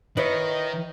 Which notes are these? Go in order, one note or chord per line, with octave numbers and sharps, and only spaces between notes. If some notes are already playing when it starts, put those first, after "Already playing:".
D#3 E4 B4 C#5 D#5